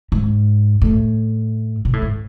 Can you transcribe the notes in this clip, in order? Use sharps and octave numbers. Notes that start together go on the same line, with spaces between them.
G#2
A2
B2
A2
G#2